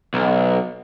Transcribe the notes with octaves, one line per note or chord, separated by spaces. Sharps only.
B1